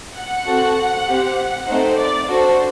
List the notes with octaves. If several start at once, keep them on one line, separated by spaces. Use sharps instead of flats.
F#5
C4 F#4 A4
C4 G4
A3 C4 D#4 C5
D5
D4 F#4 A4 C5